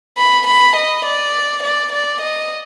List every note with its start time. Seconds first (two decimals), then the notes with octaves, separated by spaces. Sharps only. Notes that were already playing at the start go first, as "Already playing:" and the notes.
0.18 B5
0.47 B5
0.76 D#5
1.05 D5
1.63 D5
1.92 D5
2.21 D#5